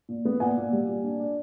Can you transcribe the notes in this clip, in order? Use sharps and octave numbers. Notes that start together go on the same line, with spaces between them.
A#2
B3
A#2 F#5 G#5
A#2
G3
A#2
D4
D4